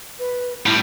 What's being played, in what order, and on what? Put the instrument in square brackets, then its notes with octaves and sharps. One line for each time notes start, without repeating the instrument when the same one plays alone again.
[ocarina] B4
[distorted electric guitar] A2 G3 [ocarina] E4